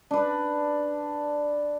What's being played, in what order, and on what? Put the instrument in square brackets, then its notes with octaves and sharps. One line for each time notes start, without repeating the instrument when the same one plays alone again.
[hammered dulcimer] D4 B4